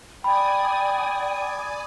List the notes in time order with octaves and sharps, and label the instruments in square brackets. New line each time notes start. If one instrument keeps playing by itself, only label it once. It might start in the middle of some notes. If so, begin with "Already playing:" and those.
[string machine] D5 G#5 D#6 [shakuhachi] G5 [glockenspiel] B5